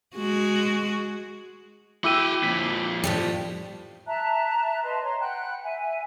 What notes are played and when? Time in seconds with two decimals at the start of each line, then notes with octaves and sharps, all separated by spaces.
0.15 G#3 F#4
2.04 E4 F#4 G5 D6 E6 D#7
2.43 F2 A#2 B6
3.04 A2 F3 G3
4.06 E5 A5 A#5 F#6
4.83 B4 D#5 A5 C6
5.02 C#5 A#5 C6
5.20 F#5 G5 B5 F#6
5.62 E5 G#5